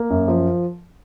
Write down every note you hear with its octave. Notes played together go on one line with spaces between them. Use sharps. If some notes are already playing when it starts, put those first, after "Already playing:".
Already playing: A#3
F#2
F3